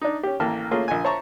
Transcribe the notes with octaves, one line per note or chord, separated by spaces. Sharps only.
D4 D#4
C#4 G4
A1 A#3 G5 A5 F6
A3 A#3 C#4 F4 G#4
A#1 G#5
C5 C#5 E5 A5 A#5 C#6